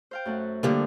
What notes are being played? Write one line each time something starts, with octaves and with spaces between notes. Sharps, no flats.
C5 F5 G5
F#2 A3 F#5
D3 F3 G3 A#3 G4